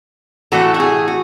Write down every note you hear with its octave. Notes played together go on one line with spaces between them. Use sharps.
A2 E3 A3 F#4 A4
F#4
G#4
F#4